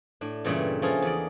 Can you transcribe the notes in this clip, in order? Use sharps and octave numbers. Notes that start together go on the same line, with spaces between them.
A2 D4
G2 A#2 C#3 E3 G3 A3
F3 A#3 C#4 F4 G#4 A4
E2 C#4 D5